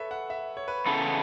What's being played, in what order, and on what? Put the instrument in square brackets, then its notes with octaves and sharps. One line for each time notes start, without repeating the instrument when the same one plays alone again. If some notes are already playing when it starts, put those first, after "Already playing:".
Already playing: [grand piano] A4 B4 C#5 E5
F#5
E5
C#5
B4
[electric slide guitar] C#3 E3 B3 A4